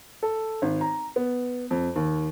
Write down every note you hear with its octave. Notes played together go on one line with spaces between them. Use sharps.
A4
G#1
A#5
B3
F2
D#2